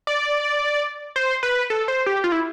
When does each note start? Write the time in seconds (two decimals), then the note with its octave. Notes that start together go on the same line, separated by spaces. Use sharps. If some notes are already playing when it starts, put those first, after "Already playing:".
0.07 D5
1.16 C5
1.43 B4
1.70 A4
1.88 C5
2.06 G4
2.24 F4
2.32 E4